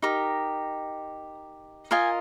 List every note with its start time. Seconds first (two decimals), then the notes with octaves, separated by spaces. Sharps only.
0.02 D#4 G4 A#4 A#5
1.91 F4 A#4 D#5 G#5